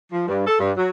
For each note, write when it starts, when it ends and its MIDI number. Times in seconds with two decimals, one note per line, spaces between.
0.12 0.25 53
0.28 0.45 43
0.46 0.55 69
0.59 0.71 43
0.77 0.90 54